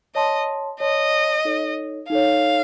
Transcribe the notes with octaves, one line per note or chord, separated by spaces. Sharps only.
C#5 D#5 A5 C6
C#5 D#5 A5 C6
D#4 A4 C#5
D#4 A4 C#5 F5